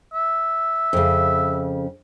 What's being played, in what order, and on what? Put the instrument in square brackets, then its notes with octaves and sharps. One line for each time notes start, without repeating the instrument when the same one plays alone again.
[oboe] E5
[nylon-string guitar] F2 C#3